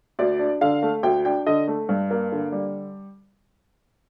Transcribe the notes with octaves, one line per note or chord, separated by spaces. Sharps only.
D2 D5
D4
D3 F5
A3
D2 G5
D4 G5
D3 D#5
A3
G2
A#3
D3
G3